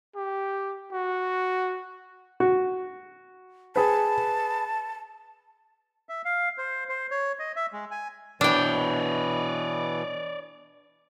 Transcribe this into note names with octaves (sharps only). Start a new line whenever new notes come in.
G4
F#4
F#4
G#4 B4 A5
E5
F5
C5
C5
C#5
D#5
E5
G#3
G#5
B2 E3 D4 C#5 D5 G5